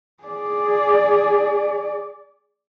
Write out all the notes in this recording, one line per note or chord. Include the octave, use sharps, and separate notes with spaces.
G#4 D5